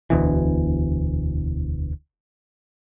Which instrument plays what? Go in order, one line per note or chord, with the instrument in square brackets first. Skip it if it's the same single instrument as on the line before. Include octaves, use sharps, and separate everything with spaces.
[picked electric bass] E1 D2 B2 E3